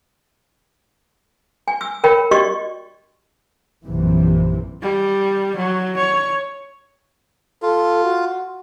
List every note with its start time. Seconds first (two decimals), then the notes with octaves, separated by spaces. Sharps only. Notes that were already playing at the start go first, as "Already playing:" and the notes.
1.68 G#5
1.81 E6
2.04 A#4 C#5 G5 B5
2.31 F#4 G4 D5 D#5 C#6
3.85 A#1 F#2 C3 E3
4.82 G3
5.56 F#3
5.97 C#5
7.62 F4 A4
8.04 F#4